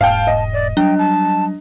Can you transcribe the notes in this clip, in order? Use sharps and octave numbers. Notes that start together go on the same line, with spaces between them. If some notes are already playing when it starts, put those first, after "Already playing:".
E1 G#2 F5 G5 A5
D#5
D5
F#3 G3 D4 G5
A5